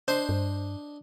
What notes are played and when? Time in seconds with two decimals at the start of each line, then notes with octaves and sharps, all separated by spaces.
0.08 D4 C5 D#5
0.29 G2